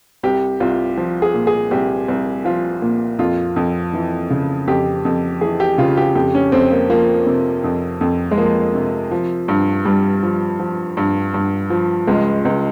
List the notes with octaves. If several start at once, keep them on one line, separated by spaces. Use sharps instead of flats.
C2 G4
C2 F4
F3
G#4
A#2
G#4
C2 G4
C2
F3 F4
A#2
F2 F4
F2
E3
C#3
F2 G4
F2
E3 G#4
G4
C#3 F4
G4
F2 G4
C#4
F2 C4
A#3
F3 A#3
C3
F2
F2
G#3
F3 A#3
C3
F3
G2
G2 G3
F3
F3
G2
G2
F3
C#2 G#3
C#2